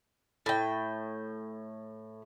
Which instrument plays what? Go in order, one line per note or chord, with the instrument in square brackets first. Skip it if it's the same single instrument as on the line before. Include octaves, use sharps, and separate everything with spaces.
[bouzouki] A2 G5